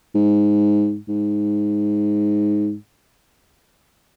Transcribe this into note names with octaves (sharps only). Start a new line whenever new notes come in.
G#2
G#2